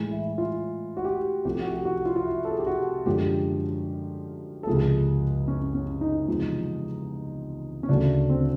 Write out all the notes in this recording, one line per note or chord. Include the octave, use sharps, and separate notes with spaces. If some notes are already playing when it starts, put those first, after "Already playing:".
Already playing: A2 E3 G#3
E4
E4
F4
F#4
G4
C2 C3 F3 A3 G4
F#4
G4
F#4
F4
F4
E4
A4
G#4
G4
F#4
F#2 D3 F3 G#3 G4
A4
C#2 C3 F3 G#3 G#4
C#4
C#4
D#4
E2 C3 F3 G#3
C#4
D2 C#3 F#3 A3 D4
C4